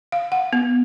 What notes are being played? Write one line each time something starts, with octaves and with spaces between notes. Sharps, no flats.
F5
F#5
B3